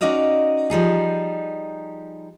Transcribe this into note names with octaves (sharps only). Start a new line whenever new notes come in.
C#4 D#4 F#4 D5 D#5 F5
F3 G3 D#4 G#4